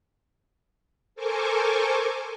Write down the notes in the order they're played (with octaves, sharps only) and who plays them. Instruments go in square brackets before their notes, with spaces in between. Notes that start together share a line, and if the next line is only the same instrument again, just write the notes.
[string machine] A4 A#4 C5 G#5 C#6 D6